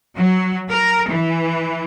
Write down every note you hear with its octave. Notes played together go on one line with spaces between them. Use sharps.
F#3
A#4
E3